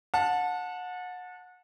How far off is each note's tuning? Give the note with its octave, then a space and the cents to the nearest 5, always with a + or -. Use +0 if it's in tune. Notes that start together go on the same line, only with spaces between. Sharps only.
F#5 -30 A5 +0